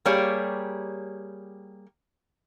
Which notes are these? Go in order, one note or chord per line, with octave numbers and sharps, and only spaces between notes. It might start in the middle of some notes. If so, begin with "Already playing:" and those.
G3 A#3 G4 G#4 C#5 D5